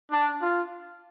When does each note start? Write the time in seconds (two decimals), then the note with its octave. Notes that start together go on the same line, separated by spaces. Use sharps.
0.12 D4
0.42 F4